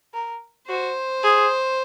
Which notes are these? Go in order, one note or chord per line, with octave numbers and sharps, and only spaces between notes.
A#4
F#4 C5
G#4